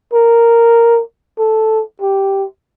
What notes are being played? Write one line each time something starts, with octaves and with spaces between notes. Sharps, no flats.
A#4
A4
G4